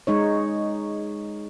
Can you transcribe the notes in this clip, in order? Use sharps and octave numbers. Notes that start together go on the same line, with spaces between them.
G#3 D#4 C#5